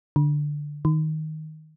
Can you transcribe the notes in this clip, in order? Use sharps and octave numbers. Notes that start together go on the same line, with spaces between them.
D3
D#3